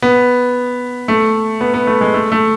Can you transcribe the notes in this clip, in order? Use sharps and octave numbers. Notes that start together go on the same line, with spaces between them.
B3
A3
B3
B3
A3
G#3
A3
A3